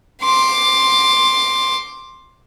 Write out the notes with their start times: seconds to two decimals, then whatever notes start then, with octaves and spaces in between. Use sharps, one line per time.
0.23 C6 D6